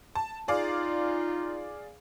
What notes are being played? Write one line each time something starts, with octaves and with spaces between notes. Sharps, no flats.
A5
D#4 F4 G#4 D5 F5